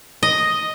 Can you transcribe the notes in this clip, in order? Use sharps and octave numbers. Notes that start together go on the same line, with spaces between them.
D#5